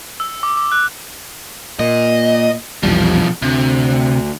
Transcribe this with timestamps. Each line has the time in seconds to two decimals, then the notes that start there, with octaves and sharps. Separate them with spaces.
0.20 E6
0.43 D6
0.57 D6
0.72 F#6
1.80 A#2 D#5
2.83 A#1 E2 B2 F3 G3
3.42 D2 C3